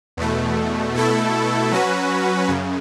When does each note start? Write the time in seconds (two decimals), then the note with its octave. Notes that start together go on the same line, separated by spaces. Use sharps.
0.17 E2 B2 A3
0.94 B2 A3 E4 A4
1.71 F#3 C#4 F#4 B4
2.48 F#2 C#3